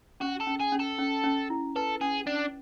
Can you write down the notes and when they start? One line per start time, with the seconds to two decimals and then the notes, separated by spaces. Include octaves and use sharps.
0.20 C#4 F#4
0.40 A4
0.47 C#4
0.60 G#4
0.72 C#4
0.79 A4
0.98 C#4
1.24 C#4
1.50 E4
1.76 A4 B4
2.01 C#4 G#4
2.26 C#4 D4